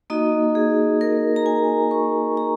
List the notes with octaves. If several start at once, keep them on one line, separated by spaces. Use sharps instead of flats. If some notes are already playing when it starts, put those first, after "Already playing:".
A#3 D#4 F#4 D#5
G#4
A#4
A#5
G#5
C#6
A#5